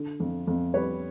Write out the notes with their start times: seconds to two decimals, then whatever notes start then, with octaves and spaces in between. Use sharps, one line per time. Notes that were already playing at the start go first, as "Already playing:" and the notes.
Already playing: D3
0.20 F2
0.47 F2
0.74 G3 B4 C#5